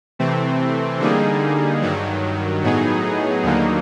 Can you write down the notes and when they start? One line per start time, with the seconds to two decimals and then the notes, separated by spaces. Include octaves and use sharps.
0.19 C3 E3 A3 C4
1.00 D3 G3 A#3 D#4 G#4
1.82 G2 D#3 F#3
2.63 A2 F#3 B3 D#4 G#4
3.43 D#2 D3 F#3 A#3 D#4